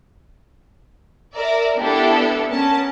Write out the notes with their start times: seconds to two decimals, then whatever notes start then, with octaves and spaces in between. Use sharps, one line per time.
1.34 A#4 D5 E5
1.76 B3 D4 E4 G4 A4
2.48 B3 C#4 A#4 A5